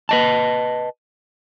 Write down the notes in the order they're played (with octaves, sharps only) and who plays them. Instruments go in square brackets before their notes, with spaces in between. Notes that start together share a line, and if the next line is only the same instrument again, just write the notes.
[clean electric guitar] B4 D#5 A5